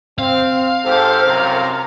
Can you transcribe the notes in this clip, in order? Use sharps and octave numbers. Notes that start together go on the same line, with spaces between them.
C4 F5
G#2 G4 A4 C5
C2 F#2 C3 A#4